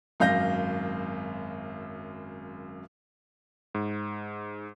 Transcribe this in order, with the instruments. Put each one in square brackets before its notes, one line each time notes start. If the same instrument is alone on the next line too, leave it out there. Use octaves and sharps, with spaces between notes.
[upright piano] G#1 F#2 F5 G6 A#6
[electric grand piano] G#2